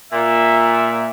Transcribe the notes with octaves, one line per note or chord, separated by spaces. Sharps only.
A#2 E5